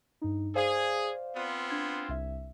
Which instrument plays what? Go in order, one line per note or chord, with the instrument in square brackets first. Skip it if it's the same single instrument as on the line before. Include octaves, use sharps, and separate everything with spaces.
[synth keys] G2 D#4
[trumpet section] G#4 [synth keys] C5 D5 F5
[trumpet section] B3 C4 F4
[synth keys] D4 G#6
C2 E5